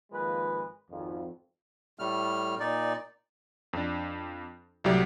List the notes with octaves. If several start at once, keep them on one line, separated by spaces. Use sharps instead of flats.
G#1 F3 G#3 A#3 B4
G#1 F2
A2 G3 A3 F6
A#2 D#4 D5
F2 D4
C2 A2 F#3 G4 D5